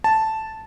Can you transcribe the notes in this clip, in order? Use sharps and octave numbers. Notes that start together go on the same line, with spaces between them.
A5